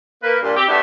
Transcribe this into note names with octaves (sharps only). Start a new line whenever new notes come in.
A#3 B4
G2 A#2
C4 G4
A3 B3 D4 E4 G4